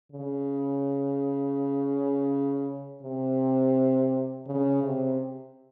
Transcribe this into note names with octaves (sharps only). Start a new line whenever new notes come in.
C#3
C3
C#3
C3